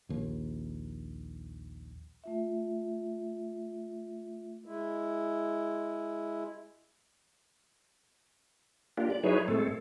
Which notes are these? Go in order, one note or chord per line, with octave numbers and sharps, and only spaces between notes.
A#1 D#2
A3 F4 E5
G#3 E4
A#3 D4 F4 G4
D5
F#3 D#4 E4 G#4 B4 C#5
A2 G#3 A3 C4 A4